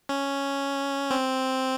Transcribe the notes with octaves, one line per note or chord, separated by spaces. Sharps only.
C#4
C4